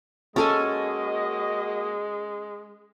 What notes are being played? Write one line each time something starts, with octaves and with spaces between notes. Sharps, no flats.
G#3 A#3 C#4 F#4 A4 D#5 G#5